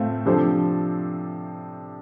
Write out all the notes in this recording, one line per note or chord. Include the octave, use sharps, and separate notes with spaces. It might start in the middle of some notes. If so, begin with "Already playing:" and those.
Already playing: A2 A3 C4 F4
C3 F3 D4 A4 C5